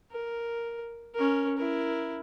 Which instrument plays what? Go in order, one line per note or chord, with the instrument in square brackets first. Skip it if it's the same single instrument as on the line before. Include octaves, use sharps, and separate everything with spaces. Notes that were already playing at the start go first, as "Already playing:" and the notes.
[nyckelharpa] A#4
C#4 A#4
E4 A#4